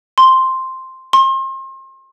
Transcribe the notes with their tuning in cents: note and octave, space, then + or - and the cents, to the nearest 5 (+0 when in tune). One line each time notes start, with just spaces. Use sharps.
C6 +0
C6 +35